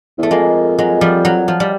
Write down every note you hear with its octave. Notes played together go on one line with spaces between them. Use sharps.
E2 A3
F2 G#3 A#3
F#3 G#3
F3 G3
F#3
F3
G3